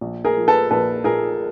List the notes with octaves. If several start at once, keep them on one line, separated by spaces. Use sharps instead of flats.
A#1
G#4 A#4
F3
A4 B4
A#1 A4 B4
A#2 G#4 A#4